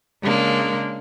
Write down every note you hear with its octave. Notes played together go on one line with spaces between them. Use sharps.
C#3 G#3 A#3 D4